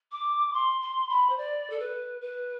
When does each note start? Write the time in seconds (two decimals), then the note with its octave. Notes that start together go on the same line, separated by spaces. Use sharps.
0.12 D6
0.53 C6
0.81 C6
1.09 B5
1.29 C5
1.37 D5
1.70 A4
1.79 B4
2.21 B4